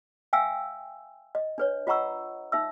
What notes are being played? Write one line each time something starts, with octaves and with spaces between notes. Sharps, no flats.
E5 F5 G5 G#5 E6
D#5
D4 B4 C#5
F4 D#5 F#5 A#5 C#6 E6
D#4 E5 E6